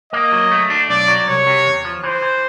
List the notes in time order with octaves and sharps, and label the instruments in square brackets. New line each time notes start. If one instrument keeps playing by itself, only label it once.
[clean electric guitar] A#3 [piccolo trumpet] D#5
[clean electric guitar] F#3
A3
D4
[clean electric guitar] B1 [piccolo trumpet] D5
[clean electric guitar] F#3
[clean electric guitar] C2 [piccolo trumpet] C#5
[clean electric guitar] C3
E2
F3
[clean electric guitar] E3 [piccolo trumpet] C5
[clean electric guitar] E3